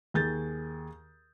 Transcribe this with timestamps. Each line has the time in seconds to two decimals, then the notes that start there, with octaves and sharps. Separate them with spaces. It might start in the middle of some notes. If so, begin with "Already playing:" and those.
0.14 D#2 G#4 G6 A6